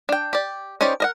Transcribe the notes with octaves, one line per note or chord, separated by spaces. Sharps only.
D4 G5
G4 D5
C#4 D#4 G4 C5 D5
A#4 D#5 F#5